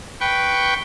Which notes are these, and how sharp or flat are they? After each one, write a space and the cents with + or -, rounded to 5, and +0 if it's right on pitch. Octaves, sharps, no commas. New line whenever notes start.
B4 +0 G5 -5 C#6 +0